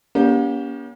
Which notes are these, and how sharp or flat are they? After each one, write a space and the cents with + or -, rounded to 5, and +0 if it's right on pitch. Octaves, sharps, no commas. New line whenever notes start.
A#3 +45 C#4 +40 G4 +0